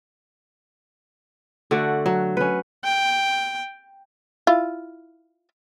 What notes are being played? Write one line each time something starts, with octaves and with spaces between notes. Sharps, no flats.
D3 A3 F#4 D5
F#3
C#4 B4
G5
E4 F4